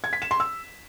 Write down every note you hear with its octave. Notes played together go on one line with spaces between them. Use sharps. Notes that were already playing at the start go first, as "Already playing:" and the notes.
G#6
B6
E7
C6
E6